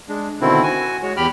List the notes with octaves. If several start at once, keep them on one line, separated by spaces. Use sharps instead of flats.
G#3 D4
B2 D3 D#3 C4 E4
F#4 G#5
G#3 F#4 C#5
E2 G4 G5 B5 F6